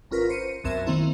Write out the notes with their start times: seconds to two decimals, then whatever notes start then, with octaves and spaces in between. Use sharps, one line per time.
0.11 G#1 C#4 F4 A#4 B4
0.30 C5 C#7 D#7
0.64 B1 F#2 C4 A#4 E5 E7
0.87 D#3 A#3 C4 E4